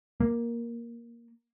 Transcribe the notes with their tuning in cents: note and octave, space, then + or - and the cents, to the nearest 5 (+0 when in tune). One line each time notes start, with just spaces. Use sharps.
A#3 +10